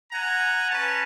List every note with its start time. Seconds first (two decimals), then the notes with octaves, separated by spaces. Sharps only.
0.10 F#5 G#5 A#5
0.70 C#4 B4 A5